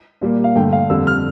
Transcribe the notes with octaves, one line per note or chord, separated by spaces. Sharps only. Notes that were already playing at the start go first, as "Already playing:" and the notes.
A#2 G3 A#3
F5
G2 D3 A3 G5
F5
F2 D3 G3 E6
F6